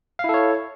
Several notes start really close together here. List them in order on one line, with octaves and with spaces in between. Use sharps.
F5 E4 A4 C#5